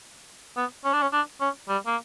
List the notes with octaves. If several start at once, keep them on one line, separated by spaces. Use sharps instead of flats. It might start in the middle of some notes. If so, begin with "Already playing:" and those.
B3
C#4
D4
C#4
D4
C#4
G3
A#3